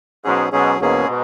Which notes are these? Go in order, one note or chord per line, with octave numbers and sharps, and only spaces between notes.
G#2 B2 F#3 C#4 G#4
G#2 B2 F#3 C#4 G#4
E2 G#2 B2 A#3 C#4 G#4
B2